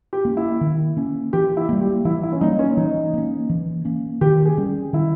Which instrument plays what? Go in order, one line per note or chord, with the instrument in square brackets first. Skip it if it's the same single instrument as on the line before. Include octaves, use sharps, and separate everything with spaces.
[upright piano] G4
[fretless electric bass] A#3 C#4
[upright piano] E4
[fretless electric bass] D#3
A#3 C#4
[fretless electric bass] E3 [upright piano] G4
[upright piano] E4
[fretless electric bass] G3 A#3
[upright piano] G4
[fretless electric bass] E3 [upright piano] E4
[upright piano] E4
C#4
[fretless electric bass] G3 A#3 [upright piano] D#4
[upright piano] C#4
[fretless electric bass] E3 [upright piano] D#4
[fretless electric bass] A#3 C#4
E3
A#3 C#4
[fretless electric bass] D#3 [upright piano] G4
[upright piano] G#4
[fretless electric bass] G3 C#4
[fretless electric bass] D#3 [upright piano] E4